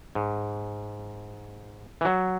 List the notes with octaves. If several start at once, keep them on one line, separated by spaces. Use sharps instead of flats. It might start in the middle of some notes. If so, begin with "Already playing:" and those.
G#2
E3
F#3